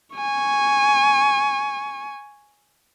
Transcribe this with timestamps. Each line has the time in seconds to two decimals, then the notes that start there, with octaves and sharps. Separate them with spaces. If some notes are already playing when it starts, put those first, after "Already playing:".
0.16 G#5 C#6